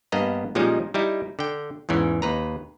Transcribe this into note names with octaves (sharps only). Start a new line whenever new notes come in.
G2 A#3 B3 D#5 A#5
A#2 F3 G3 G#3 C#4 D#4
G3 D#4 E4
D3 G5
E2 G#2 E3 C#4
D#2 B4 A#5